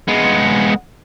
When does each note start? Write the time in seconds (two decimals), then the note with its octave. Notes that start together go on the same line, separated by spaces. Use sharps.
0.08 G#3 B3